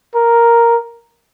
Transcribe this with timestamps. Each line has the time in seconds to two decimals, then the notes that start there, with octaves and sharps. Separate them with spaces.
0.16 A#4